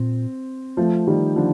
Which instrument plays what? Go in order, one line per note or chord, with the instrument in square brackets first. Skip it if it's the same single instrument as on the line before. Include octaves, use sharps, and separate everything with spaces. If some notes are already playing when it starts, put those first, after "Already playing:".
Already playing: [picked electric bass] A#2 [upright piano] C4
[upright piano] F3 A3
D#3 G3
D3 F3